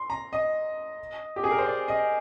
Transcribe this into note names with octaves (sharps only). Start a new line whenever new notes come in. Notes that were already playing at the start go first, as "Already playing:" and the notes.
Already playing: C6
A#5
D#5
G4
G#4
A#4
C5
D5
D#5